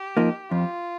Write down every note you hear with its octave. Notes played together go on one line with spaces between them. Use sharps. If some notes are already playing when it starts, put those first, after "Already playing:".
Already playing: G4
F3 A#3 D#4
F2 F4